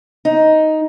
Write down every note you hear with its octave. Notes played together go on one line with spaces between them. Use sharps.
D#4